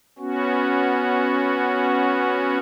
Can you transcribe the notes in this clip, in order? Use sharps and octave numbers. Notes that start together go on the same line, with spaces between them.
B3 C#4 F#4